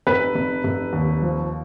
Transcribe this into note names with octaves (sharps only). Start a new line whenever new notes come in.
F1 B4
F1
F1
D#2
F3